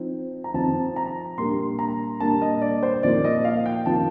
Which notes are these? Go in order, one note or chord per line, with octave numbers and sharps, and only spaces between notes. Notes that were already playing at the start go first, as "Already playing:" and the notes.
Already playing: F3 C4 D#4
A#5
F3 C4 D#4 A5
A#5
A#2 G3 A#3 D4 C6
A#5
A#2 G3 A#3 D4 A5
D#5
D5
C5
A#2 F3 A#3 D#4 D5
D#5
F5
G5
A#2 F3 A#3 D#4 A5